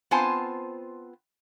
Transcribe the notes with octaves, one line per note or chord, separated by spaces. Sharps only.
B3 C4 F4 C5 G#5 A5